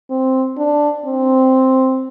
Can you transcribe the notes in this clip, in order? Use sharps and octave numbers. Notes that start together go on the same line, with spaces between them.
C4
D4
C4